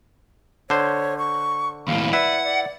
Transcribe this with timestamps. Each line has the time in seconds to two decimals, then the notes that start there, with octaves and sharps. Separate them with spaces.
0.70 D3 C5 C#5
1.18 C#6
1.88 D#2 A2 F5
2.13 E4 B4 D5 E5 F#5
2.44 D5